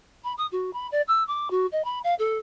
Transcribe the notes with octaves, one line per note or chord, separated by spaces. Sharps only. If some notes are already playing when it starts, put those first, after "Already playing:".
B5
D#6
F#4
B5
D5
E6
D6
F#4
D#5
B5
F5
A4